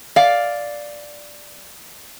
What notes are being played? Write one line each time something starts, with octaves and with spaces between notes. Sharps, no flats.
D5 F5